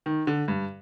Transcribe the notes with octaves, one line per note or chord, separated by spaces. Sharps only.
D#3
D3
G2